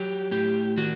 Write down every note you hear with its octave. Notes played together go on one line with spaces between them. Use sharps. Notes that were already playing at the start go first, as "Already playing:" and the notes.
Already playing: F#3 G4
A2 G4
D#3 F#4